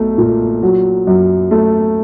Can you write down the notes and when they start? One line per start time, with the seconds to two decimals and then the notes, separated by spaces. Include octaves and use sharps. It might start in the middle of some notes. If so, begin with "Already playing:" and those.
Already playing: B1 A3
0.18 A#2
0.63 F#3
1.07 F#2
1.51 A3